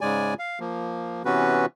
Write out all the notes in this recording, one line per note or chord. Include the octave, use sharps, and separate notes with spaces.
G#2 C#3 G#3 D5 G#5
F5
F3 A#3
C3 E3 B3 C#4 F#4 B4